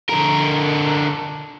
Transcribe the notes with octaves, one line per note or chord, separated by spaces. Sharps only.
D3 A#4